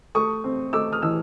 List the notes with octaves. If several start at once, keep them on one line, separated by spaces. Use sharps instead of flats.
A3 C#6 D#6
C4
A3 D6 E6
D#6 F6
E3 E6